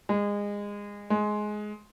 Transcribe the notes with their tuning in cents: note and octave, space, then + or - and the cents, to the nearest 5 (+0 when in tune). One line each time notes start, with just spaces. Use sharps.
G#3 -25
G#3 +15